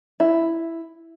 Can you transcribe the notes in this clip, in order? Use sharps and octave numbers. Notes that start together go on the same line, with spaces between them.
E4